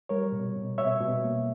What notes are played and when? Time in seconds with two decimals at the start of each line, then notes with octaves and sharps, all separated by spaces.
0.09 G3 A#4 C#5
0.32 B2
0.56 B2
0.78 B2 C#5 E5
1.00 B2
1.23 A#3